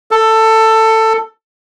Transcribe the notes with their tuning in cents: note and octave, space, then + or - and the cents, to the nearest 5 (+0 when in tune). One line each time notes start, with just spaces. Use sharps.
A4 +15